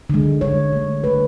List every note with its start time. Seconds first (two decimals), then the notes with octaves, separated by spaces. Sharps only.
0.10 D3 G#3
0.41 D3 G#3 C#5
0.73 D3 A3
1.04 D3 A3 B4